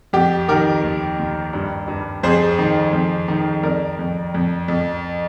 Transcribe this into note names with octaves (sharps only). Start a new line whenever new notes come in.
F2 G4
D#3 G4 A#4
D#2
D#2
G2
G2
F2 G#4 C5
D#3
F2
D#3
F2 A#4 D5
F2
F2
F2